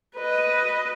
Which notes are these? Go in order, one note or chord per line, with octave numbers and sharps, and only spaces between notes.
B4 D#5